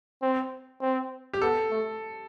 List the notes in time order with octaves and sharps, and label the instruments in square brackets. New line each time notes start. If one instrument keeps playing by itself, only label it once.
[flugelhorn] C4
C4
[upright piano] G4
[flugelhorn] B3 [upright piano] A4
[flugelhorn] A3